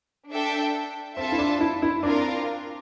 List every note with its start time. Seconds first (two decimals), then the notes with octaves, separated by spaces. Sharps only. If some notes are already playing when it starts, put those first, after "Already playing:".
0.30 D4 A4 E5 G5
1.17 C4 F4 A4 E5 A5
1.32 E4
1.39 D4
1.60 E4
1.82 E4
2.03 C4 D4 F4 A#4